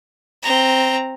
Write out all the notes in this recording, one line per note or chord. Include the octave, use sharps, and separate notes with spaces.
C4 A#5